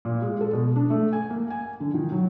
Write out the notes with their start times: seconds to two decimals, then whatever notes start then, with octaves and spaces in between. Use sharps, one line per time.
0.05 A#2
0.22 G#3
0.41 A4
0.53 B2
0.76 D4
0.90 A3
1.13 G#5
1.30 A#3
1.50 G#5
1.80 D3
1.94 D#3
2.12 F#3